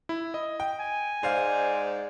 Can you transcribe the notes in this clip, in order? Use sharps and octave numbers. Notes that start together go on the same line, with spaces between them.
E4
D#5
G5
G#5
G#2 G#3 C5 D5 F5